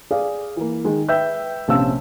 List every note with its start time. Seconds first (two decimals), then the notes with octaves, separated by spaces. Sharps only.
0.11 G#4 D5 F5
0.57 E3 A#3
0.84 D#3 G#3
1.09 B4 E5 G5 E6 G6
1.68 A#1 C3 C#4 F5 A5 E6